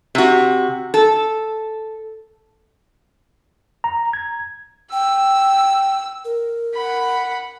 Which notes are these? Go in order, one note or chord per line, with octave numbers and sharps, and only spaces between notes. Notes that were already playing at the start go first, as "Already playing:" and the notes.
C3 F#4
A4
A#5
G#6
G5 E6
A#4
F#5 B5